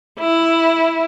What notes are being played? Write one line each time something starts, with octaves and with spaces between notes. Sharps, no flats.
E4